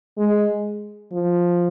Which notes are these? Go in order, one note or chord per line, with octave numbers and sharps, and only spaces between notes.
G#3
F3